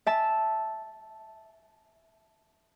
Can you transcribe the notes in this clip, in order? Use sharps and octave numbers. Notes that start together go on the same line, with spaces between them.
E5 A5